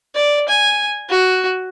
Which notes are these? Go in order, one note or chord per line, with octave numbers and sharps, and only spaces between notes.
D5
G#5
F#4